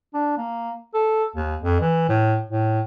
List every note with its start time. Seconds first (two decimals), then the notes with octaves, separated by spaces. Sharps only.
0.14 D4
0.38 A#3
0.94 A4
1.36 D#2
1.62 F2
1.80 E3
2.09 A2
2.51 A2